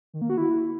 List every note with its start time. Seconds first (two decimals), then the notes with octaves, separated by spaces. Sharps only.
0.14 D#3
0.22 A#3
0.30 F#4
0.38 E4